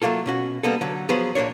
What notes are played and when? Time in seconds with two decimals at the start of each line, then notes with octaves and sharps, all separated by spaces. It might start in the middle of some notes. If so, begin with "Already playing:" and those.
0.02 F#3 A3 A#3 F4 A4
0.26 B2 C#4 F#4
0.63 G3 A#3 B3 A4
0.81 D3 F#3
1.09 F3 F#3 B3 G#4 B4 C5
1.35 C2 A#2 A#3 D4 C#5